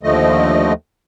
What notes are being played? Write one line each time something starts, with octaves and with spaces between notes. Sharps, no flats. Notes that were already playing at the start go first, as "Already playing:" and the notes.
D#2 D3 F3 A3 D#5